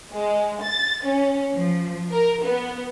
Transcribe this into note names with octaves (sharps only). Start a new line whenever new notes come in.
G#3
A6
C#4
F3
A#4
B3